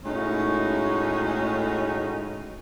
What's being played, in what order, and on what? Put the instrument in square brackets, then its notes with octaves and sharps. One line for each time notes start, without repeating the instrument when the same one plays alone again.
[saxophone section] A2 G#3 A3 C#4 D#4 F#4